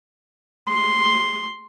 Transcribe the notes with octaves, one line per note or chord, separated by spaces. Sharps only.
C6